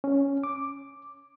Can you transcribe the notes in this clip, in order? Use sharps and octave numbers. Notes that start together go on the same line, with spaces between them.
C#4
D6